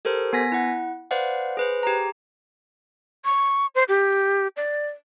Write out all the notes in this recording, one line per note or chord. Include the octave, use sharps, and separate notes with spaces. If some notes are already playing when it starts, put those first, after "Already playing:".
G4 A4 A#4 C5
B3 G#5 A#6 B6
E4 F#5
B4 C5 D5 F5 F#5
G#4 B4 C5
G4 G#4 A#5
C#6
C5
G4
D5